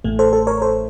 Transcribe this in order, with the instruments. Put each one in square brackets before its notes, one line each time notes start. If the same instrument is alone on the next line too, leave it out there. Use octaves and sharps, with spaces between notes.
[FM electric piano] A1 A2 A3
A4 C5
A4 C5
A#4 C#5
A4 C5